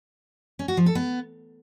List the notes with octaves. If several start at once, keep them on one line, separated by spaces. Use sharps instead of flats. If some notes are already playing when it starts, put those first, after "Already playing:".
C#4
F#4
F3
A4
B3